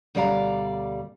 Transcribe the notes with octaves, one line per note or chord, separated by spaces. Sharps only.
D2 B2 G3 D5 F5 A#5